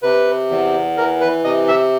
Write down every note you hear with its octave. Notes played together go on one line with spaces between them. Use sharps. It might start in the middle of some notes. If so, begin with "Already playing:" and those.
C3 B4
E2
E3 A#4
B4
C3 D#5
E5